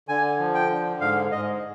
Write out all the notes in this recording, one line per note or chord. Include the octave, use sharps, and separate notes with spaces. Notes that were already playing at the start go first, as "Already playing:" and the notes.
D3 G#5
F3
G5
D3
G#2 F5
G#2 D#5